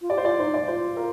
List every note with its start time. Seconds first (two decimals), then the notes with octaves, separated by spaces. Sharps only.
0.02 F4
0.10 G4 D5
0.18 C5
0.25 F4 D5
0.39 D#4 C5
0.54 D5
0.68 F4 C5
0.97 A#4